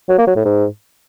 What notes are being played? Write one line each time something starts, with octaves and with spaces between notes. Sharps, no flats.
F#3
A#3
F#3
A2
G#2